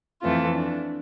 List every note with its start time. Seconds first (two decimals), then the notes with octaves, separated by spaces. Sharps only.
0.23 F2 E3 A3 F4
0.54 D4